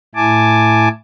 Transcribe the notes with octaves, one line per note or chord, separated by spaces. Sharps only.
A2 E4 G#5 A5 D6